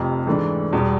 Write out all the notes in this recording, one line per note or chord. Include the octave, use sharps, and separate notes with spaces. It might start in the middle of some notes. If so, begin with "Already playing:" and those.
Already playing: F1 F2 C3
G#2 E3 A3 D4
E2 B2 G3